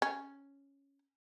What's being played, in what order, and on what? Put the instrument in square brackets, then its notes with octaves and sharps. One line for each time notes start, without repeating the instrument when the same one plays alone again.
[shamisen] C#4